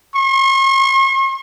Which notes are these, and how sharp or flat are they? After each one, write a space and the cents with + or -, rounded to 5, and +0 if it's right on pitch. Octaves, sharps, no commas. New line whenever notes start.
C#6 -45